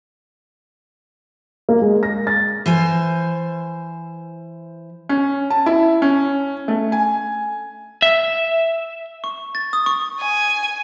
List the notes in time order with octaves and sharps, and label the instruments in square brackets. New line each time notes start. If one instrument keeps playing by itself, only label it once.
[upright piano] A#3
G#3
A#6
A6
[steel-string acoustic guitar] E3 C5 G#5
[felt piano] C#4
A5
E4
C#4
A3
G#5
[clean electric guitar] E5
[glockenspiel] C#6
A6
D#6
C#6
[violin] G#5